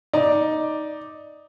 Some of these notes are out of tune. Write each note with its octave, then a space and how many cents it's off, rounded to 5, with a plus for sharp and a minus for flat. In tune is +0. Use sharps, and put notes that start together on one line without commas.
D#4 +0 D5 +0